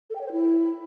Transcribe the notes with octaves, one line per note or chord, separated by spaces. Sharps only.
A4
G5
C#5
C5
E4